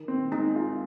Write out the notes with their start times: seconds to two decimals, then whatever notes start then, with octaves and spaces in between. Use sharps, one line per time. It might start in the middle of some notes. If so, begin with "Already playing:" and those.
Already playing: D#3
0.08 C4
0.31 G#3 D#4
0.56 F4